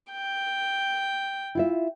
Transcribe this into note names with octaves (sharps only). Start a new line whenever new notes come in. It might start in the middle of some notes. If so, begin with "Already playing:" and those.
G5
E4 F4 E5